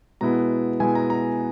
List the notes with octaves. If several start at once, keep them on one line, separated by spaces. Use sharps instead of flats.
B2 G#3 B3 E4 A#5
B2 G#3 B3 E4 G#5
A#5
A#5